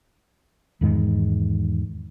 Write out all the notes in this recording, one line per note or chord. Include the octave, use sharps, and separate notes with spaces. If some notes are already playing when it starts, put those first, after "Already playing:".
E2 G#2 D#3 G#3